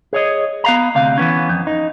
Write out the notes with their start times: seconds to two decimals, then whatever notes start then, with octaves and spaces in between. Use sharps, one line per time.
0.13 G#4 C#5 D#5
0.64 B3 F5 A#5
0.95 D2 C3 F5
1.18 E3 B3 C#4
1.49 F2
1.67 D#4